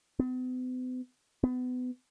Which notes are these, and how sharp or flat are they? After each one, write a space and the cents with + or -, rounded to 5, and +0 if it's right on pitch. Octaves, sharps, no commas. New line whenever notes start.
B3 +45
B3 +30